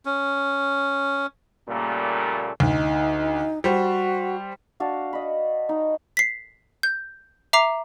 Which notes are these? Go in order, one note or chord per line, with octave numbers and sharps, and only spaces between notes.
C#4
A#2 C#3 G3 A3 A#3
D2 D#4
G3 F#4 C5
D4 F#4 F5 A5
D#5 B5
D#4
B6 C7
G6
E5 A#5 D6 C7 F7